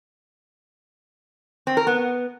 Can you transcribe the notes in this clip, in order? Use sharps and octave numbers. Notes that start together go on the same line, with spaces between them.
C4
A#4
B3